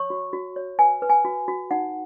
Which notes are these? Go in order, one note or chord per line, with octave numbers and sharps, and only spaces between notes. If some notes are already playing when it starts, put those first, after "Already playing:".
Already playing: C#5 C#6
F#4
F#4
C#5
B4 G#5
B4
G#5
F#4
F#4
D#4 F#5